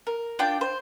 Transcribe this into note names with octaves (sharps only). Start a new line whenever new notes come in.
A#4
D4 F4 G5
C5